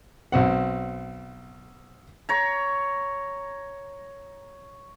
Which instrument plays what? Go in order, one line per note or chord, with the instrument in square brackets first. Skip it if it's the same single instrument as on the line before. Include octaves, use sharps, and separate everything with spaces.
[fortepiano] B1 C4 F#5
[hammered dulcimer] C#5 A#5